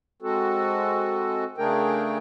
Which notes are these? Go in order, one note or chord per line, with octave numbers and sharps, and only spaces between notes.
G#3 C4 F#4 A4
C#3 A3 D4 G#4 A#4 G5